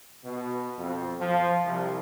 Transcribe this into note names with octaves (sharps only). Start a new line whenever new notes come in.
B2
F2
F3
C2